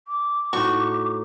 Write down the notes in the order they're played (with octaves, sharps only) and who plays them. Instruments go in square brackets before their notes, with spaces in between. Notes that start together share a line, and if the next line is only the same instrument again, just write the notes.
[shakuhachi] D6
[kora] A2 D#4 F#4 [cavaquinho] C#6